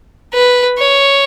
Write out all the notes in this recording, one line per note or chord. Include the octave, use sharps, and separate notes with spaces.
B4
C#5